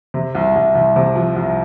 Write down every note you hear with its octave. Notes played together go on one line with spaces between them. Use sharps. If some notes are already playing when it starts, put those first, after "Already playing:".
C3
C2
C2
C2
C3
F3
C2